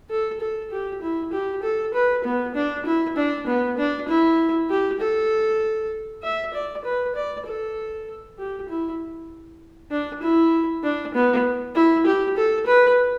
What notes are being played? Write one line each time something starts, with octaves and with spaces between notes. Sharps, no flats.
A4
A4
G4
E4
G4
A4
B4
B3
D4
E4
D4
B3
D4
E4
G4
A4
E5
D5
B4
D5
A4
G4
E4
D4
E4
D4
B3
E4
G4
A4
B4